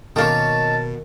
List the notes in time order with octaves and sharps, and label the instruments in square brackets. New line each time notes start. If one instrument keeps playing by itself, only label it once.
[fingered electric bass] B2 [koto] D#3 A#3 [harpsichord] C#4 D#4 [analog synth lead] A5